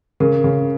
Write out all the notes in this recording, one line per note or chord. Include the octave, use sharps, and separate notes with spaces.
C#3 A#4
C#3